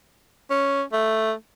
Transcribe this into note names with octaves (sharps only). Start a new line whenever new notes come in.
C#4
A3